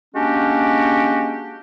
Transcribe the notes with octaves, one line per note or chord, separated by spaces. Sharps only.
G#3 A#3 C#4 D4 F#4 G4